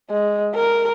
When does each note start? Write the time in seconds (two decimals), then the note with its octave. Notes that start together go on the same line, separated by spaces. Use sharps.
0.10 G#3
0.54 A#4